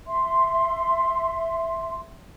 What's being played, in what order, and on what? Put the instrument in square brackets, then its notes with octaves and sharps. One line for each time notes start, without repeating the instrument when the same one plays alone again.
[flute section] E5 C6